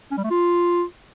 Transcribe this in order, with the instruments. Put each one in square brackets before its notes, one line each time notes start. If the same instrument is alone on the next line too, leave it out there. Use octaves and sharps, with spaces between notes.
[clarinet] C#4
G3
A3
F4